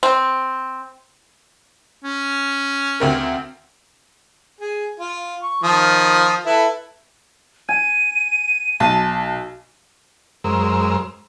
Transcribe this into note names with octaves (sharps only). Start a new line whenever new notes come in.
C4
C#4
D2 C4 A#4
G#4
F4
C#6
D#3 F3 D#6
E4 A4 B4
G#5 D#7
B1 A5
F#2 G#3 A#4 C5 E6